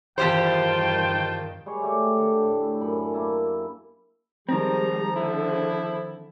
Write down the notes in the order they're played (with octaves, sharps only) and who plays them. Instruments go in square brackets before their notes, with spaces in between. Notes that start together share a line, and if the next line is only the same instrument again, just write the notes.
[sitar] E2 G4 C5 [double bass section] G2 D#3 [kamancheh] F4 A5 [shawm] G5
[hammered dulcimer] G3 G#3 G#4 C#5
A3 G4 G#5
D3 D4
A2
F#2 B5
A#3 E4 A5
[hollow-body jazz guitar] D#3 C4 [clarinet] F3 [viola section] G3 G#3 [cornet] A#5
[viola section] D3 [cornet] E4